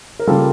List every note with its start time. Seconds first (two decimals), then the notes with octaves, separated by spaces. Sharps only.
0.19 A#4
0.27 C#3 G3 A#3 F4 A4